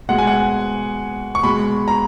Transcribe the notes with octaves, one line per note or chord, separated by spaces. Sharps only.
B2 G#3 F#5
G#5
F#5
C#6
B2 G#3 B5
A#5